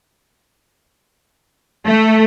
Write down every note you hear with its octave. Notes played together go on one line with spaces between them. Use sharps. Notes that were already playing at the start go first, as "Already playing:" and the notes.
A3